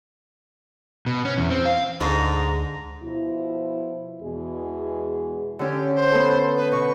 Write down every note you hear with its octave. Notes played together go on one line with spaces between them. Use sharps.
B2
C#4
E2
C4
F5
D2 G#2 D3 G#3 A#5
B2 F3 E4
E2 B2 E3 G#3 G#4
D3 C#4 G4
C5
B3 A4
B4
B2 C#6